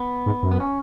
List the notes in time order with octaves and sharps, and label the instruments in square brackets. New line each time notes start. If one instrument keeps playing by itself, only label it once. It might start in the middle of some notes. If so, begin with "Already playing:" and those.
Already playing: [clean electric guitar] B3
[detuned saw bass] G#2
F#2
[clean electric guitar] B3
C#4